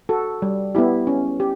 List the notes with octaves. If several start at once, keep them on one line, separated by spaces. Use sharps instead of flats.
F#4 A4
G3
B3 E4 G4
C#4
G4